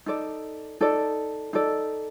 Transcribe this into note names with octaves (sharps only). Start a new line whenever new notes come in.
D#4 A4 D5
D#4 A4 D5
D#4 A4 D5